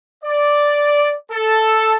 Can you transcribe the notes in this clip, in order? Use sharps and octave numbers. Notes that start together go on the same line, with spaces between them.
D5
A4